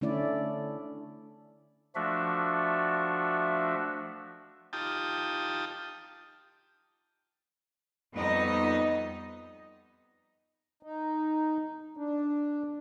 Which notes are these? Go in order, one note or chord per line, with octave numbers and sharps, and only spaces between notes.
D3 A3 C#4 E4 D5
F3 A3 D4 F#4 E5
D#4 F4 G4 G5 A5 D#6
F2 G3 B3 D#4 D#5
D#4
D4